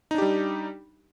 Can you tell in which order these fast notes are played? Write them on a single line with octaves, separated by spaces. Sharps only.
D#4 D4 G4 G3